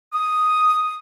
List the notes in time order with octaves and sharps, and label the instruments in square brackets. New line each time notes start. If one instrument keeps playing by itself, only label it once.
[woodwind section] D#6